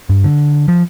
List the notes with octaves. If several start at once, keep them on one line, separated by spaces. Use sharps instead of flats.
G2
D3
F3